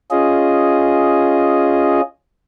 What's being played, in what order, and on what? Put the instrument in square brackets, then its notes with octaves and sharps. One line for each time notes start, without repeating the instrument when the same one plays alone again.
[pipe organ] C#4 F4 G#4 D#5